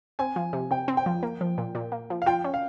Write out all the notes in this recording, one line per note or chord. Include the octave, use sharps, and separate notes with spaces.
C4 G#5
F3
C3
C3 G5
C4
G5
F3
A#3
F3
A#2
A#2
A#3
F3
F5
F4 G5
C#4
F5